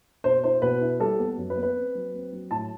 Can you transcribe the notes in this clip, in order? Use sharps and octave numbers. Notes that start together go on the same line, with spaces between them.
B2 C5
E4 C5
B2 B4
E4
G3 A4
B3
F#2
B4
B3
B4
C4
F#3
C4
F#3
A2 A5